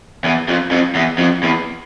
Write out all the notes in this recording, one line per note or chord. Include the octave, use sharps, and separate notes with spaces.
E2
F2
F2
E2
F2
E2